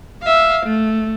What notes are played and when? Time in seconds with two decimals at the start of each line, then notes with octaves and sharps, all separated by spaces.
0.23 E5 F5
0.65 A3